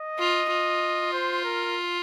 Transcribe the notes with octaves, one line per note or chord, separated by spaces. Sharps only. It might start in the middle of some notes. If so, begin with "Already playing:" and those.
Already playing: D#5
F4
F4
C5
A#4